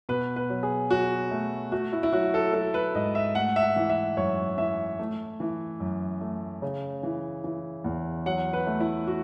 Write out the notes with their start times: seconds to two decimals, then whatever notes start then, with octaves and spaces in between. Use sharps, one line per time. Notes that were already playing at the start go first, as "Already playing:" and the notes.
0.09 B2 B4
0.36 B4
0.50 F#3
0.63 G#4
0.90 F#3 F#4
1.31 A3
1.72 A3 F#4
1.93 E4
2.03 E4
2.13 F#3 F#4
2.34 A4
2.54 F#3 A4
2.74 B4
2.95 G#2 D#5
3.15 E5
3.35 A3 F#5
3.56 E5
3.62 F#5
3.76 E3
3.90 E5
4.17 F#2 C#5
4.58 E3 E5
4.99 A3
5.40 E3
5.80 F#2
6.21 A3
6.62 C#3
7.03 E3
7.44 E3
7.84 E2
8.26 F#3 F#5
8.53 B4
8.67 A3
8.80 E4
9.07 F#4